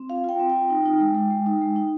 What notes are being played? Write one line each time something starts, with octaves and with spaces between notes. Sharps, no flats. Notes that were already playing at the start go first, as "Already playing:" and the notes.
Already playing: C4
F4 F5
F4 G5
C4
G5
F4
D#4
D#4
G#3
G#3
G#3
D#4
G#3
D#4